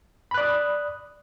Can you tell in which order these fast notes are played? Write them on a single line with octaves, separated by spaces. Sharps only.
B5 F#6 D5 D#6